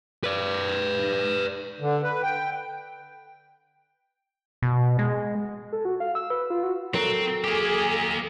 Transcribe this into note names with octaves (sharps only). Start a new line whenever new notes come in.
B4 D5
D3
B4
G5
B2
G#3
A4
F#4
F5
E6
B4
F4
F#4
F#3 C4 A4 A#4
A#3 G4 G#4